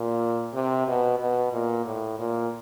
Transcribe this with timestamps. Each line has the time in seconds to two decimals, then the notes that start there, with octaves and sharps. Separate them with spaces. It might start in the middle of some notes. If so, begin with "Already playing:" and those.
Already playing: A#2
0.54 C3
0.88 B2
1.19 B2
1.53 A#2
1.86 A2
2.19 A#2